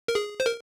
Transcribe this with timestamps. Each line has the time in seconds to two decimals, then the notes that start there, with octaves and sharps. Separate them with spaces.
0.08 A#4
0.15 G#4
0.40 C5
0.46 A#4